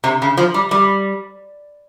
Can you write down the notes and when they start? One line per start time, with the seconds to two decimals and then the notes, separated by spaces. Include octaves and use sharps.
0.04 C3
0.22 C#3
0.37 F3
0.54 G3
0.71 G3